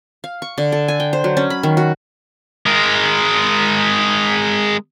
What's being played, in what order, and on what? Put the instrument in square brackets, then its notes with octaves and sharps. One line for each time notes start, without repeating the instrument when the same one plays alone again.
[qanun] F5
C#6
D3
A4
G#5
G5
C5
F#3
C#4
B5
D#3
F#4
[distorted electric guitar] G#3 A#4